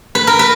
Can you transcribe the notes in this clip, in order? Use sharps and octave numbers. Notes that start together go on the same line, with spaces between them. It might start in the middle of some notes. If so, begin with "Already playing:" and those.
B4
A#4
B4